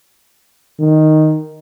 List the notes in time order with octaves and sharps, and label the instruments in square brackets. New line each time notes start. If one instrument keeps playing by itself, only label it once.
[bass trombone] D#3